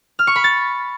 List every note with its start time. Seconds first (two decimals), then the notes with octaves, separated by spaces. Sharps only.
0.19 F6
0.27 C#6
0.36 B5
0.44 A6